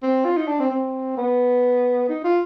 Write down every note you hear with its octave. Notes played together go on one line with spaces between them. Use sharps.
C4
F4
D#4
D4
C4
C4
B3
D#4
F4